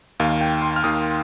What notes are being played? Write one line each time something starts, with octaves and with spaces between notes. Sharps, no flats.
D#2 D#3 F5
G5
C6
F6
D#2 D#3 D#6